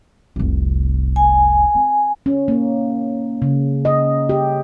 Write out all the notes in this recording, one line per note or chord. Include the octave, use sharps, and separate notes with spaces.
F1 C2
G#5
C4
C#4
A#3
C#3
D#5
G4